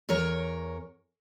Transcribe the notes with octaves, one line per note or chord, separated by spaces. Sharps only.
E2 A#4 C#5